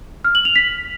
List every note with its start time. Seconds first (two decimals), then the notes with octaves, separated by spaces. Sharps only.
0.25 F6
0.35 F#7
0.45 F7
0.56 B6